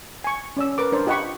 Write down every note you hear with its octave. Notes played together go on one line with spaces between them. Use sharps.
G#5 C#6
C#4 D5 E6
A#4 B4 D6
D4 A#4 C5 D5
F4 G4 D#5 F#5 B5 C#6